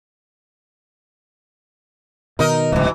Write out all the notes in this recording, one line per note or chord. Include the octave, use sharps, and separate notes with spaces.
B2 D#3 D#4 A#4 D#5
D1 C#2 B2 E3